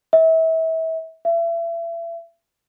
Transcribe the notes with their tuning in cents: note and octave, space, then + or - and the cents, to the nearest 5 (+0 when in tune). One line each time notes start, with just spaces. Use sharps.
E5 -30
E5 +35